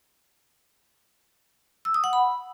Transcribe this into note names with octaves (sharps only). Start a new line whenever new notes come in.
E6
D#6
F#5
B5